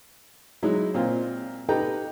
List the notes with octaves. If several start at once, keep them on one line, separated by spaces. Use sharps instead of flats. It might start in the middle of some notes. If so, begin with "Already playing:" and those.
F#3 G#3 D#4 E4
A#2 C4 F4
D#4 G4 A4 B4 G5 A#5